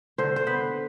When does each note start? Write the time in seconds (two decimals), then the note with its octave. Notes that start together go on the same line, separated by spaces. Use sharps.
0.18 D3 C5
0.36 C5
0.47 B3 B4